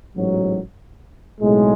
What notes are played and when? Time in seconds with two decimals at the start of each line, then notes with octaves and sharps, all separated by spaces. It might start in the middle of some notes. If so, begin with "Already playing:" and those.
0.14 A1 G#2 F#3
1.40 B1 A2 G#3